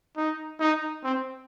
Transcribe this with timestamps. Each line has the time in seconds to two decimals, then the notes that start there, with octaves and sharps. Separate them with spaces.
0.17 D#4
0.60 D#4
1.04 C4